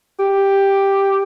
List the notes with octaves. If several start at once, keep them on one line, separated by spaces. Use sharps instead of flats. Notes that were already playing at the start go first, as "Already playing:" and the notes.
G4